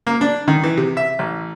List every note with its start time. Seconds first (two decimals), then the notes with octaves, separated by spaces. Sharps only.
0.07 A#3
0.21 D4
0.48 D#3
0.63 E3
0.77 C3
0.97 E5
1.19 A1